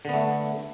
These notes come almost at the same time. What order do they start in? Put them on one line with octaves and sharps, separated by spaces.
D3 B3 A3